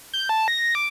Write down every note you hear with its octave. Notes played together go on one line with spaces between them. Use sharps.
G6
A5
A#6
D6